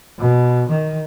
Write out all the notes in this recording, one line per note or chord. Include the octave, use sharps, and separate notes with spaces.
B2
D#3